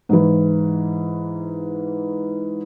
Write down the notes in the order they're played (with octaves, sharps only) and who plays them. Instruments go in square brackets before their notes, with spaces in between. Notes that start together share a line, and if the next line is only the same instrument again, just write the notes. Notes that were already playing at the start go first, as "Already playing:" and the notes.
[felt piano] G#2 E3